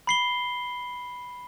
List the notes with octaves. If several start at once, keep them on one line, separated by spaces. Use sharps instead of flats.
B5 C7 G7